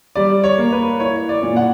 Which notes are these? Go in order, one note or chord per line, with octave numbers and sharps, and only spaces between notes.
G3 D5
C#5
A#3
B4
E4 C#5
D5
A#2
F#5